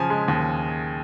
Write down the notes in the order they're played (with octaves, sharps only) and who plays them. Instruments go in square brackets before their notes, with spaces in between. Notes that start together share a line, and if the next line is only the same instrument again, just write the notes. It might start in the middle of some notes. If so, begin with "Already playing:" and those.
Already playing: [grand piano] C#3 F3 G#5
G#3
D#2